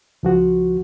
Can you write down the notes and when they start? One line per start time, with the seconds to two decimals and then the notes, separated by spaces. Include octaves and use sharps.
0.23 C#2 F3 F#4